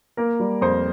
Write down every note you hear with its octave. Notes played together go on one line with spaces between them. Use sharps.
A#3 A#4
G3
F2 C5